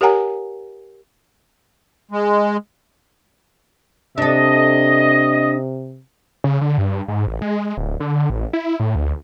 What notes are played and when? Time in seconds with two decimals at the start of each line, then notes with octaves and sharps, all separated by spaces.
0.01 G4 A#4 C#5 F#5 G#5 A#5
2.11 G#3
4.18 C3 D4 A4 D#5
6.44 C#3
6.61 D3
6.78 G2
7.08 G#2
7.27 A1
7.42 G#3
7.78 D1
8.00 D3
8.30 A1
8.53 E4
8.80 A2
8.95 D2